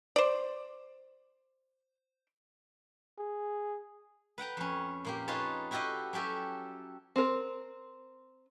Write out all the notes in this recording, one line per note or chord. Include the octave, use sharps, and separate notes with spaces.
C5 D5
G#4
B4 F#5 G5 A#5
F2 C#4
A#2 A#3 G4
D#4 F4 G#4 B4 C#5 A5
E4 F#4 G4 A4 D#5 F5
F#3 C#4 G4 A4 E5
C4 A#4